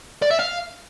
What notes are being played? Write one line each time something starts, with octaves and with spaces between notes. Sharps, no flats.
D5
E5
F5